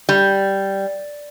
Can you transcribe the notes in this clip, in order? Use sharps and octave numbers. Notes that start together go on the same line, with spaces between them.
G3